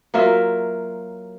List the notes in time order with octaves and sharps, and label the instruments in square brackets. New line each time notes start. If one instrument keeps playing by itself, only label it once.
[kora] F#3 A#3 F4 E5